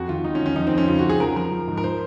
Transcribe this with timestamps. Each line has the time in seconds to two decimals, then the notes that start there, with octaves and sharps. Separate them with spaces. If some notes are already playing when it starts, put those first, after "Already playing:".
Already playing: F2 F#4
0.08 D#3 F4
0.24 F2 D#4
0.35 C#4
0.40 D#3
0.46 C#4
0.56 F3 D#4
0.67 C4
0.72 F2
0.78 C#4
0.88 C#3 F4
0.99 F#4
1.04 C#3
1.10 G#4
1.20 F3 A#4
1.36 F3 A#4
1.52 F3
1.68 G#2
1.78 A#4
1.84 C5